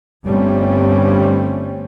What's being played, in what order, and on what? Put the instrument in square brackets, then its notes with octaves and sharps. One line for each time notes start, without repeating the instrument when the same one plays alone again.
[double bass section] G1 G2 G3 A3 C4 C#4